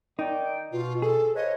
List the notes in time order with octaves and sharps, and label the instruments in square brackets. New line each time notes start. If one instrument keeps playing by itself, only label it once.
[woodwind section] D#3 D5 G5 [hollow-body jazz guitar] D#4
[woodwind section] B2 [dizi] F4
[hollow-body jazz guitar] G#4 [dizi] A4
[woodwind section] F3 B4 C#5 [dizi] D#5